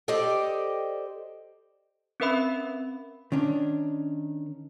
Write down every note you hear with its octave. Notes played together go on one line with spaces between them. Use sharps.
G4 A4 C5 D5 D#5 G5
C4 C#4 A#4 B4 E5 B5
D#3 C#4 D4